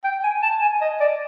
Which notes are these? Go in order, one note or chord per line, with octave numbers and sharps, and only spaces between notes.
G5
G#5
A5
G#5
D#5
D5